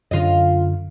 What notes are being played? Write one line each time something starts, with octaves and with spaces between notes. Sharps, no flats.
F#2 D3 F4 D#5